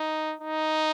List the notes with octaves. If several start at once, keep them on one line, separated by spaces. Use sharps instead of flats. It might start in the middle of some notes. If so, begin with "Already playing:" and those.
Already playing: D#4
D#4